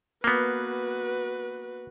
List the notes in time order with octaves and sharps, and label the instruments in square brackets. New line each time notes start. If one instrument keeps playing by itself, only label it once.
[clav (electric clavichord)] A#3 B3 [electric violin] F#4 B4